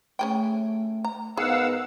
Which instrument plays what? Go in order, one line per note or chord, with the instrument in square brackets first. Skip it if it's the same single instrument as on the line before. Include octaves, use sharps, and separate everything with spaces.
[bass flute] A3 [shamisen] C#4 G#4 G5
[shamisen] A#5
[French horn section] G#2 B3 D#4 [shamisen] G#4 [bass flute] A#4 [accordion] F5 F#5 E6